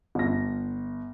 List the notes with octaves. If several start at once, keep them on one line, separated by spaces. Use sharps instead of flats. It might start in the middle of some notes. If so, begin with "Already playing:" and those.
G1 A#6